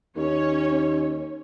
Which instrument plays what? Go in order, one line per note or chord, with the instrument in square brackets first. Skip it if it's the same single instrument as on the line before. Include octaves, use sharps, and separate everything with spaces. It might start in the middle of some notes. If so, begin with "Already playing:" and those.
[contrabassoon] D#2 [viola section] C#4 C#5